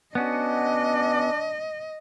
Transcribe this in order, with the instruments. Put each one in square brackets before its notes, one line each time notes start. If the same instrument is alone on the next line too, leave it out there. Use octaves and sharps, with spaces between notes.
[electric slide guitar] B3 C#4 F#4 [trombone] D4 [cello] D#5